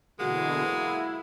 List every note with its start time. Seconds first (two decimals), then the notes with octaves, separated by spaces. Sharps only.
0.19 B2 D3 E3 F#3 G#3 A#3 F#4 F#5
0.68 E4